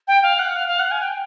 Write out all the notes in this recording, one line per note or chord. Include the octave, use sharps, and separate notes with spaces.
G5
F5
F#5
F5
F5
F#5
G#5
G5